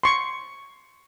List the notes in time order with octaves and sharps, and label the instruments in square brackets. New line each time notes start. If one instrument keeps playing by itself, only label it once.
[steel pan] C6 C#6